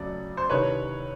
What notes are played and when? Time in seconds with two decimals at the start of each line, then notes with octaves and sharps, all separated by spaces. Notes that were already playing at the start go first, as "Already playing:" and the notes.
Already playing: F2 C#3 F#3 A3 D5
0.37 C5
0.50 C2 C3 D#3 B4 C#5